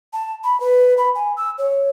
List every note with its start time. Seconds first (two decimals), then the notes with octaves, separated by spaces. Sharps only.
0.13 A5
0.44 B5
0.60 B4
0.98 B5
1.15 G#5
1.37 E6
1.58 C#5